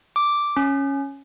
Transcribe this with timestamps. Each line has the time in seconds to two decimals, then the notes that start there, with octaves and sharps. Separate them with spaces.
0.16 D6
0.57 C#4